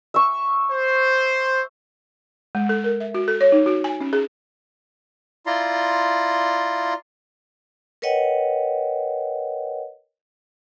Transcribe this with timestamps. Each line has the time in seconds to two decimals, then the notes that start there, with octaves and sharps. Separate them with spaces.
0.14 E5 C#6
0.71 C5
2.55 G#3
2.69 A4
2.84 A#4
3.00 E5
3.14 F#4
3.28 A4
3.41 C#5
3.52 D#4
3.66 F#4
3.84 G#5
4.01 C#4
4.13 G#4
5.46 E4 F4 D5 A#5 C6
8.02 A#4 B4 C#5 D#5 F#5 G5